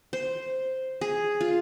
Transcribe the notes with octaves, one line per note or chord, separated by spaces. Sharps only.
C5
G#4
F4